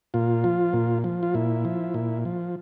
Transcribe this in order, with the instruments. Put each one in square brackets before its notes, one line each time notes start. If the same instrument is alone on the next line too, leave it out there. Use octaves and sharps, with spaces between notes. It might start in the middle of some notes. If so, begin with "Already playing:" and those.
[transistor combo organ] A#2 F4
F3
A#2
F3
F4
A#2 E4
F3
A#2
F3